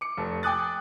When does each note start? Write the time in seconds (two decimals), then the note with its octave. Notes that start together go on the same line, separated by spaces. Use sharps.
0.01 D6 C#7
0.17 F1 A4
0.43 G5 G#5 D6 D#6 F#6 A6